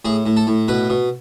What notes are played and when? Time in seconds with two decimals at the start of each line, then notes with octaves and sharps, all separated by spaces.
0.05 A2 G#4
0.26 A2
0.37 A4
0.47 A2
0.68 B2 B4
0.90 B2